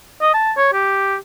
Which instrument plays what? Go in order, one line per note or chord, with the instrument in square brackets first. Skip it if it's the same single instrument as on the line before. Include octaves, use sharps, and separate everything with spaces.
[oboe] D#5
A5
C#5
G4